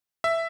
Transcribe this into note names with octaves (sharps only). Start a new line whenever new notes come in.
E5